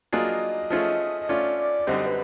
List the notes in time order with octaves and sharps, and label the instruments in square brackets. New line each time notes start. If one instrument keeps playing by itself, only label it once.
[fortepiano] F#3 A#3 D4 F4 G#4 [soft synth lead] D#5
[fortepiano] F3 A3 C#4 F4 G#4
[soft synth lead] D#5
[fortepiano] A3 C#4 F4 [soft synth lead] D5
[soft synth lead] D5
[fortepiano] F#2 D3 G3 C4 D#4 [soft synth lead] D#5
[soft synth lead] B4